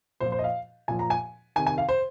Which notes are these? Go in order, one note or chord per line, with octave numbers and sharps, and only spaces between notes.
A#2 F3 C5
C5
D#5
F5
A#2 F3 G#5
A#5
G#5
C3 D#3 G#5
G#5
F5
C5